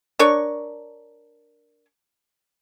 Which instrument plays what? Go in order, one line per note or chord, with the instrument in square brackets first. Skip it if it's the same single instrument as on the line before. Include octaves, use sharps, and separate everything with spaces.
[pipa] D4 A#4 C#5 C#6